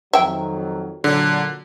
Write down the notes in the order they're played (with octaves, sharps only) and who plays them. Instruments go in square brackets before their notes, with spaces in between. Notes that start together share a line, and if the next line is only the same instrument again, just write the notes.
[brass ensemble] F2 D#3 F#3 [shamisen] E5 G5
[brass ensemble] A#2 F#3 [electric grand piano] D3